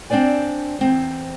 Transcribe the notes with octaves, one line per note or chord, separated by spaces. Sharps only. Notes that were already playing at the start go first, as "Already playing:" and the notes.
C4 D4 C5 D5 G#5
E2 C4 C5